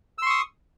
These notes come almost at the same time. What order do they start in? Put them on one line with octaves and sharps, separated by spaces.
E6 C6 C#6 D#6